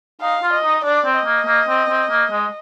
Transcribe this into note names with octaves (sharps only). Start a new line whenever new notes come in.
D#4 F5
F4
D#5
D#4
D4 D5
C4
D#5
A#3
A#3
C4
C4
A#3
G#3